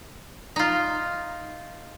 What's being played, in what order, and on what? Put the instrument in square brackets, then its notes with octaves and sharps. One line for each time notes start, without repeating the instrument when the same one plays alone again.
[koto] D#4 F4